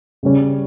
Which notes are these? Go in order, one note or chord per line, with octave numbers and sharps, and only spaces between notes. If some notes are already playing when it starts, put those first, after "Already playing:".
C#3 G3 C#4